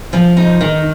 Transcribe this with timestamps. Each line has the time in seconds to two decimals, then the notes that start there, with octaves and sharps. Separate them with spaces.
0.13 F3
0.37 D#4
0.61 D#3